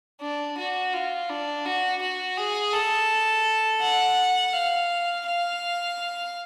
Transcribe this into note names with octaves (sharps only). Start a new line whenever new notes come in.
D4
F#4
F4
D4
F#4
F#4
G#4
A4
F#5
F5
F5